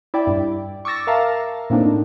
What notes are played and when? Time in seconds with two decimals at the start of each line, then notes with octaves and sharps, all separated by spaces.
0.14 E4 D5 G5
0.27 G2
0.85 C#6 D6 E6 A6 A#6
1.07 A#4 E5 F5 A5 A#5
1.70 A2 A#3 C4 D4 D#4